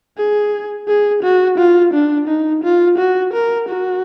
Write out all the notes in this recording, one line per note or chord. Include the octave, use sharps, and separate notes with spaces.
G#4
G#4
F#4
F4
D4
D#4
F4
F#4
A#4
F#4